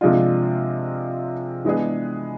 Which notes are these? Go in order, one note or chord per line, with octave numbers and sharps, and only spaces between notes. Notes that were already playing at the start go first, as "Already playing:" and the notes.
C3 F3 G#3 D4 F4
E3 G#3 B3 D4 G#4